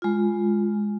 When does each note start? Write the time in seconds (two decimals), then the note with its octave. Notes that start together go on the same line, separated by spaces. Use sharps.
0.02 G#3 F4